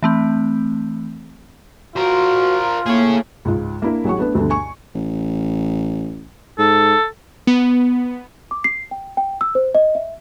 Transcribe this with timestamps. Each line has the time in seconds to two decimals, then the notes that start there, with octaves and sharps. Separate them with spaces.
0.03 E3 A3 C4
1.96 F4 F#4 A#4 C5
2.86 A2 A#3 G#4 C#5
3.45 C#2 G#2 F4
3.82 A#3 D4 E4 A#4
4.05 A1 F#3 G#4 F#5 C#6
4.18 A3 B3 D4 B4
4.35 D2 G2 B2 D3
4.50 G#5 C#6
4.95 A1
6.59 G#2 A4
7.47 B3
8.51 D6
8.64 C7
8.91 G5
9.17 G5
9.41 E6
9.55 C5
9.75 D#5
9.95 E5